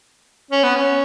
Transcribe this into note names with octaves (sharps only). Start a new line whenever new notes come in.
C#4
B3
C#4